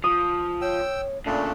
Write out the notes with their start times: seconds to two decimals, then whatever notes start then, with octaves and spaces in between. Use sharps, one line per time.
0.04 F3 D#6
0.61 C#5 G5 E6
1.26 A#2 C#3 A3 D4